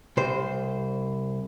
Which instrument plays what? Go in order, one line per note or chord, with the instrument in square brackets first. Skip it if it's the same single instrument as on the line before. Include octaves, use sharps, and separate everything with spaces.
[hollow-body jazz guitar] C2 C5